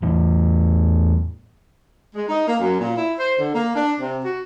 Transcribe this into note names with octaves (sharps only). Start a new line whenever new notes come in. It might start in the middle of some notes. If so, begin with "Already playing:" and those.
E2 A2
G#3
D#4
A#3
F#2
A#2
E4
C5
D3
A#3
D4
C3
F#4